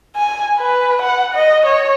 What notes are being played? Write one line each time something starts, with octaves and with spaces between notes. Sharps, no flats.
G#5
B4
F#5
D#5
C#5